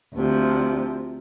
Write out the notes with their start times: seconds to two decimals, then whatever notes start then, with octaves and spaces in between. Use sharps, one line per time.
0.15 D2 C3 F3